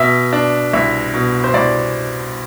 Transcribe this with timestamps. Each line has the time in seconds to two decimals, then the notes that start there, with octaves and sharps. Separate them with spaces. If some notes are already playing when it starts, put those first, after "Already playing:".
Already playing: B2 E5
0.33 D4
0.73 C2 E5
1.14 B2
1.44 C5
1.54 C2 D5